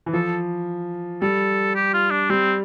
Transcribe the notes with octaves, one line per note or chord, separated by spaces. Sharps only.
E3
F3 A4
G3 A4
G4
F4
D4
G3 C4